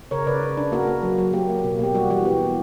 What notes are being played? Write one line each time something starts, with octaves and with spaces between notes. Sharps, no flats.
C#3 A#4 C#5
C#3 B4 D5
C#3
D4
A#3 F#4 A#4
A#3
F#3
F#3
A#3 G4
A#3
B2
A#3 G4
G3 F#4
E3 F#4
B3 G4
E3